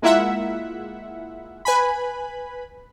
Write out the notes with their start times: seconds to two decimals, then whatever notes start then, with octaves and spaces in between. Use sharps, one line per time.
0.02 G#3 A#3 E4 F4 E5 F#5
1.65 B4 G#5 B5